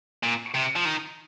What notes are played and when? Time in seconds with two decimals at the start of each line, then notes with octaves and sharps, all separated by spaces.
0.23 A#2
0.54 C3
0.76 F3
0.85 D#3